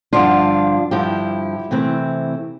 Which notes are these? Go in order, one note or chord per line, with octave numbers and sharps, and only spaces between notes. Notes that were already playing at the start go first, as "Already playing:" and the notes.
G2 D3 F3 D4 F4
G2 D3 F3 E4 G4
C3 E3 A3 C4